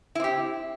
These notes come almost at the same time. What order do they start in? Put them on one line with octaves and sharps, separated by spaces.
E4 C4 G4